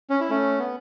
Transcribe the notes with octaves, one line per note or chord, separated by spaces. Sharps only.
C#4
E4
A3 C#4
B3